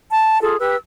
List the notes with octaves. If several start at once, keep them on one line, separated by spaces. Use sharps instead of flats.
A5
F4 G#4 A4
G4 B4 E6